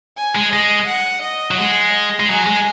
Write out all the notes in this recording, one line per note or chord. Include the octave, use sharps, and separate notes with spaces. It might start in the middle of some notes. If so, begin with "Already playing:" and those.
G#5
G#3
G#3 D#5
F#5
D#5
F#3
G#3 F#5
D#5
G#3
F#3 G#5
G#3